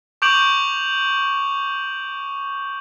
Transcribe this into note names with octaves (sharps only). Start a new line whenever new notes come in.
C#6 D6 G6 D7 F7 F#7